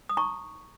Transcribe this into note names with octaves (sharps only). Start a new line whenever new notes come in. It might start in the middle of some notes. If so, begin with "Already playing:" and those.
D#6
D#4 A#5 C#6